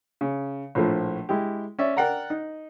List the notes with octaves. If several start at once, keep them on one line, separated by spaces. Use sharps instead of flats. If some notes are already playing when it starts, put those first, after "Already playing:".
C#3
A#1 A2 F3 A3
G#3 E4 G4
C#4 D5 E5
A#4 D5 F#5 G5 A#5
D#4